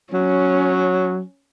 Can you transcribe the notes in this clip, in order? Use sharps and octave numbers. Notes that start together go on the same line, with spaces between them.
F#3 C#4